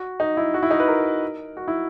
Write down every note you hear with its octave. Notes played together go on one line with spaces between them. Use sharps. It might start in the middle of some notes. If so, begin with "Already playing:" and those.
Already playing: F#4
D#4
E4
F#4
E4
D#4
B4
A#4
F#4
E4